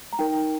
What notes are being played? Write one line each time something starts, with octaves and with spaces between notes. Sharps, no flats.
A#5
D#4 A#4 G5